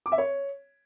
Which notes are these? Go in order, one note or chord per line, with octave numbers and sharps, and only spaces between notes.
D6
E5
C#5